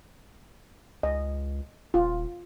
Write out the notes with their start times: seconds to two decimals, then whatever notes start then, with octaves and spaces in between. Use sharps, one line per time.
1.03 C#2 D#5
1.94 D#1 F4